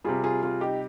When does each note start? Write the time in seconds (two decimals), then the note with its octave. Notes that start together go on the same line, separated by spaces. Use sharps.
0.04 C3 G3 F4 G#4
0.24 F4 G#4
0.43 F4 G#4
0.61 D#4 G4